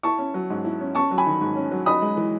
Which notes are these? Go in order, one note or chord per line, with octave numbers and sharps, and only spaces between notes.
E4 A5 C#6
C#4
F#3
G#2
E4
C#4
C#4 A5 C#6
F#3
G#5 B5
D#3
G#2
C#4
F#3
D#4 B5 D#6
G#3
E3